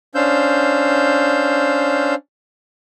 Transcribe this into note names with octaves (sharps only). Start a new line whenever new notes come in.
C#4 D4 C5 F5 E6 G6